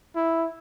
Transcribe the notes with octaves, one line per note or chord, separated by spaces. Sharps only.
E4